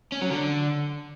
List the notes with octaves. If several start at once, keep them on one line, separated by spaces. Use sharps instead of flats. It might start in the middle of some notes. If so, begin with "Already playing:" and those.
C#4
F#3
D3